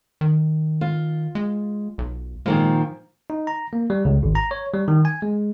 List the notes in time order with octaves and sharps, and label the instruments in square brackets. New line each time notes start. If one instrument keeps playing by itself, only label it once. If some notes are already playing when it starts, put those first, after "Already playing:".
[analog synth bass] D#3
[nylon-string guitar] F4
[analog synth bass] G#3
B1
[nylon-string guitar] A#2 D#3 F3 [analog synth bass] G#3
[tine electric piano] D#4
A#5
A#3
G3
C#2
G#1
A#5
C#5
G3
D#3
G#5
G#3